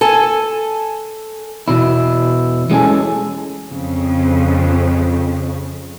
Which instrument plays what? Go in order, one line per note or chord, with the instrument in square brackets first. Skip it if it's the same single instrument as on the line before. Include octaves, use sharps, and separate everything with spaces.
[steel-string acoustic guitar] A4 G#5
[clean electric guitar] E2 B2 E4
E3 G#3 C#4 G#4 A4
[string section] F2 C#3